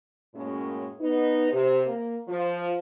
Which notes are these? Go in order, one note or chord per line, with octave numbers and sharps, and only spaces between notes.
F#2 A2 G#3 A#3 C#4
B3 D#4
C3
A#3
F3